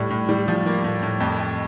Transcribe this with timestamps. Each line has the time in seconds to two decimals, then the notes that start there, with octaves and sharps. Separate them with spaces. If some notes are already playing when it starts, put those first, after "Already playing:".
Already playing: A2 G3
0.10 A2
0.29 G3
0.48 F3
0.66 A#3
0.84 A2
1.03 A2
1.20 F2
1.39 F2